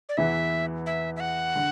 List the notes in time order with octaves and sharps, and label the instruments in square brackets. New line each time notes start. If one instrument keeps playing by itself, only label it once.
[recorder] D5
[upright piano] E2 E3 B3 E4 B4 [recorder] E5
[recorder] E5
E5
F#5
[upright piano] D3